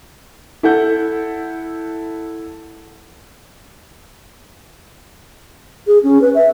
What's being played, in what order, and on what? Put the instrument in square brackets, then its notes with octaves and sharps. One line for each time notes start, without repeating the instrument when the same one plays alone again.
[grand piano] E4 A4 F#5 G6
[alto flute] G#4
C#4
B4
E5